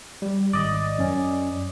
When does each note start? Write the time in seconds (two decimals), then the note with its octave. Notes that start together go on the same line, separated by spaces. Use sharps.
0.22 G3
0.53 G#1 D5 D#5
0.98 F#2 C#4